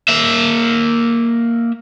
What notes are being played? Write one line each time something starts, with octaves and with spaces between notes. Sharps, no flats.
A#3 E5